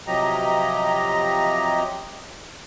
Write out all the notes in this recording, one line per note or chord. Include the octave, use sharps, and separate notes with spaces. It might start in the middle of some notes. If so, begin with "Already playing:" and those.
C3 F3 F#3 G4 D#5 A#5